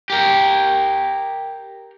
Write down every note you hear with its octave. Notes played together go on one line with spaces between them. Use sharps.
G4 A#4